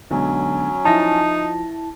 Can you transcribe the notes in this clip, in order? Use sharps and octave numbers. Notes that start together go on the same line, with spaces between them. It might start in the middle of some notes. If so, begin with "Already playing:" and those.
B1 D3 F#3 G#3 C#4
F3 D#4 E4 A5 A#6